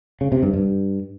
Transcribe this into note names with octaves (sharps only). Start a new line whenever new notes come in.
C#3
C3
G2
G2